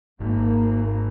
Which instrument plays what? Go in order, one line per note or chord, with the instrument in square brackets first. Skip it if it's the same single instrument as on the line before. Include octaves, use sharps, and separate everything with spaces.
[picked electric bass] G#1 [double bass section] A#3